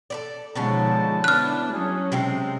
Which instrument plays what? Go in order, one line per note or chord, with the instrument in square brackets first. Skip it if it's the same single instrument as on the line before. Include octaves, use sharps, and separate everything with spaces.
[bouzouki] A4 B4 D5
[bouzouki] B2 D3 C#4 [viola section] F3 G#3 D#4 [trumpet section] A5
[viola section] B3 D4 E4 [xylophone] F6 F#6
[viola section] F#3 C#4 [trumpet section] G#4
[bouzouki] C3 G#3 C4 [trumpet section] A4 E5 G5